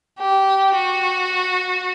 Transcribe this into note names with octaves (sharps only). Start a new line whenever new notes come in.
G4
F#4